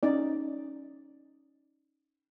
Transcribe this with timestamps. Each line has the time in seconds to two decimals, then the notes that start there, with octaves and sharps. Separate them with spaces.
0.03 C#4 D#4 D5